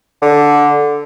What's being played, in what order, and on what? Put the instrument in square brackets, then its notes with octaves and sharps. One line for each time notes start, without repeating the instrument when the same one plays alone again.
[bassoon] D3